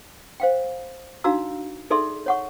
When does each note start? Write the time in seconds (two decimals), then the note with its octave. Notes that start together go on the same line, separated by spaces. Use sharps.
0.40 C5 F5 G5
1.24 D4 D#4 F#4 F5 A#5 E6
1.90 D#4 G#4 A4 D5 E5 C6
2.26 C#5 F#5 C#6